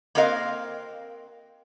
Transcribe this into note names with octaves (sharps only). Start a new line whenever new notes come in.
A#3 C4 F#4 A#4 D#5 F5